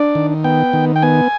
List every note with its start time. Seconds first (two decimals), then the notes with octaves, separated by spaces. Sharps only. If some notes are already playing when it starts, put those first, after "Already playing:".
Already playing: D4 D5
0.15 D#3
0.44 B3 G5
0.73 D#3
0.96 G5
1.02 B3 G#5